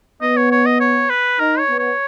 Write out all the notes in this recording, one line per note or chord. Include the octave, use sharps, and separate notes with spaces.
B3 D#5
C#5
C#5
D#5
C#5
B4
D#4 A#4
C#5
B3
C#5